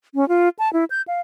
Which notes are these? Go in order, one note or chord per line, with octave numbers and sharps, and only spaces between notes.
C#4
F4
A5
E4
G6
F5